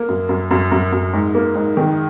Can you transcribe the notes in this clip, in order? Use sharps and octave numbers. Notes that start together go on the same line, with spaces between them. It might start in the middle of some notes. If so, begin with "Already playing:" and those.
Already playing: A#3
F#2
F#2
F#2
F#2
F#2
G#2
A#3
G#2
D#3